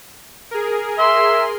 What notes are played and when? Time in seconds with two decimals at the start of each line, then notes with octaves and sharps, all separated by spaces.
0.51 G#4 A#4
0.98 E5 C6